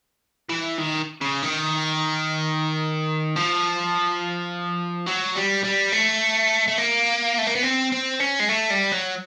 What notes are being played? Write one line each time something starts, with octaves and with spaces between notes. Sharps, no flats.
E3
D#3
C#3
D#3
F3
F#3
G3
G3
A3
A3
A#3
A3
A#3
B3
C4
C4
C#4
G#3
A3
G3
F#3